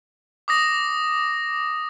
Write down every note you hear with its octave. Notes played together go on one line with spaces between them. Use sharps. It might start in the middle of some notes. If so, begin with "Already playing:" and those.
D6 D#6 A#6